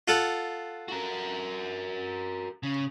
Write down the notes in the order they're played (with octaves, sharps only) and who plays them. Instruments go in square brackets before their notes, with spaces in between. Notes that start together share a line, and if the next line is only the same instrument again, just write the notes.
[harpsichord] F4 A4 F#5
[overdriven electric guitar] F#4 A#4
C#3